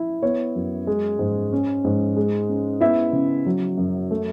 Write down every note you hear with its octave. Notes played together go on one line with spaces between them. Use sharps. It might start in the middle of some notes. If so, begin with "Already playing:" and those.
Already playing: E4
B3 C#5
F#2
G#3
G#2
C#4
G#2
G#3
C#4
B3 E4 E5
C#3
F#3
F#2
A3